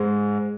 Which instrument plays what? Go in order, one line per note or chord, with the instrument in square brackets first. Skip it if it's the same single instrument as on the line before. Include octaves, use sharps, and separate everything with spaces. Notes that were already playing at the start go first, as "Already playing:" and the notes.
Already playing: [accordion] G#2 [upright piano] G#3